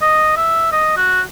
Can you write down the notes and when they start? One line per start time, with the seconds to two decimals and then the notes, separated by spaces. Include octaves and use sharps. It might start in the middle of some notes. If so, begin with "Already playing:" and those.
0.02 D#5
0.37 E5
0.72 D#5
0.96 F#4